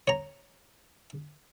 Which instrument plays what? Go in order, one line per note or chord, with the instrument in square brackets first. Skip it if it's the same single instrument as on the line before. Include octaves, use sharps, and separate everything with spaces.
[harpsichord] C#5 A#5